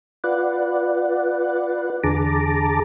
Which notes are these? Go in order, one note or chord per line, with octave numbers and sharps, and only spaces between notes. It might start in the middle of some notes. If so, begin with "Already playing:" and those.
F4 B4 D5 F#5
E2 D3 G#4 A5 A#5 D6